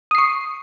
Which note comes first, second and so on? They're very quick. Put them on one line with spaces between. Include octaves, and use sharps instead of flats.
D#6 C7 C#6